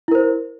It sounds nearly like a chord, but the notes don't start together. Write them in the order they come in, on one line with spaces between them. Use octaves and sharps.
E4 A#4 C5